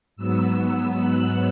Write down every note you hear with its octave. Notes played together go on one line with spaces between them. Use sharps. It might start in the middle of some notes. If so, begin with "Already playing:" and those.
G#2 F#3 B3 E6
F#6